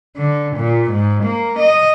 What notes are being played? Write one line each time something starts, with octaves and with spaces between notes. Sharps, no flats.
D3
A#2
G#2
A#3
D#5